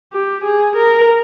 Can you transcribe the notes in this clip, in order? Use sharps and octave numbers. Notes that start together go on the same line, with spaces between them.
G4
G#4
A#4